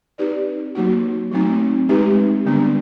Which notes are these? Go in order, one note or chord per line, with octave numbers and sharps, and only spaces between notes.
C4 D#4 G4 B4 D5
F#3 A#3 D#4 F#4
F#3 A3 C4 D#4
G#3 C4 D#4 G4 B4
D3 G3 B3 D4